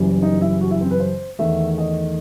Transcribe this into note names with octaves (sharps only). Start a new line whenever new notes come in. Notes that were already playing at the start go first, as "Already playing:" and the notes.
Already playing: F#1 F#2 E3 G3
D#4
E4
F#4
E4
C4
B4
C5
E2 D#3 A3 E5
D#5